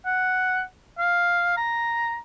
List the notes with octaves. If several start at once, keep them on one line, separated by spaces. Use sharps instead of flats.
F#5
F5
A#5